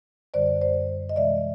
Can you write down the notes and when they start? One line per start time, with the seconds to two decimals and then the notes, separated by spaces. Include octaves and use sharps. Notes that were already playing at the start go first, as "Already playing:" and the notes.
0.34 F#2 D3 G3 C5 D5
0.61 C5 D5
1.09 D#5
1.16 C3 E3 G#3 D5 E5